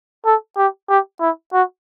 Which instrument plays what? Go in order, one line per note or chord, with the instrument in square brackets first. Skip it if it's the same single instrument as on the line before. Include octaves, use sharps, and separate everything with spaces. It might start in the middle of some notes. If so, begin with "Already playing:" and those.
[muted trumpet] A4
G4
G4
E4
F#4